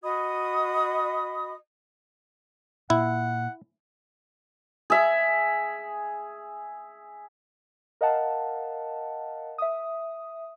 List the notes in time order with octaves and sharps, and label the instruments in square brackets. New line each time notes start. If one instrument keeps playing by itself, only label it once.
[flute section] F#4 D#5 B5 D#6
[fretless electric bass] A#2 [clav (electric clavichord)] E4 [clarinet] F#5
[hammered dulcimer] G#4 E5
[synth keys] A#4 D#5 F5 F#5 A5
E5 D#6